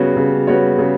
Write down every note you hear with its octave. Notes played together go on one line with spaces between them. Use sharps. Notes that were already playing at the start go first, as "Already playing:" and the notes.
Already playing: C#3 G3 B3 F#4 C#5
C#3
G3 B3 F#4 C#5
C#3